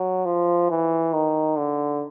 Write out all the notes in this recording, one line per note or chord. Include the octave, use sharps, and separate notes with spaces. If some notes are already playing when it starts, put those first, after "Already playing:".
Already playing: F#3
F3
E3
D#3
D3